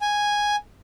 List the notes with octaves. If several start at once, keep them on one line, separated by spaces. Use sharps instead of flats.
G#5